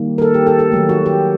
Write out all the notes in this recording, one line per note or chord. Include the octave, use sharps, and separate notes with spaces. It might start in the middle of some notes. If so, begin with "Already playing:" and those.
Already playing: D#3 G3 A#3
A#4
A4
G4
A4
A4
D#3 F#3 A3
F#4
G4